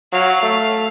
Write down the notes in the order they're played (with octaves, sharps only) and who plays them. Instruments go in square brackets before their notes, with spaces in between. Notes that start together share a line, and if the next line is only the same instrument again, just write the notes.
[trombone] F#3 [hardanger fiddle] F5
[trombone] A3